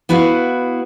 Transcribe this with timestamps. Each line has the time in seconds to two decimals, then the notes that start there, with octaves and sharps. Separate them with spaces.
0.09 B3 E4 F#4 B4 F5